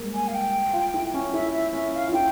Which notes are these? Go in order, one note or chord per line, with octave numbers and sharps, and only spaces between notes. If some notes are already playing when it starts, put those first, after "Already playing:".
Already playing: G3 G#3 A#3
G#5
F5
G5
F4
E4
C#4
E4 E5
E5
C#4 E5
F5
F4
E4 G5